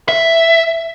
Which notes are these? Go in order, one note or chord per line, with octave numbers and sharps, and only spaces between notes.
E5